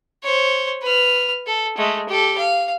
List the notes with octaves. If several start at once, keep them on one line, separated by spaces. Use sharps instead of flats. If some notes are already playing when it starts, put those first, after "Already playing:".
C5 C#5
B4 F6
A4
G#3 A3
G4 A4
F5